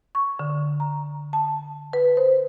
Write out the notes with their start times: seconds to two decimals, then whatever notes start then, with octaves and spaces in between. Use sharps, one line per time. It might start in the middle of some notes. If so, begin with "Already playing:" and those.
0.15 C#6
0.39 D3
0.80 A#5
1.33 A5
1.93 B4
2.17 C5